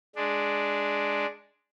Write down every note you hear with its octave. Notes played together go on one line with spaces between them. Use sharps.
G#3 D4